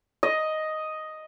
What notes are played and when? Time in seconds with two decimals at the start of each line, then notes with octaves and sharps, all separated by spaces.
0.23 D#5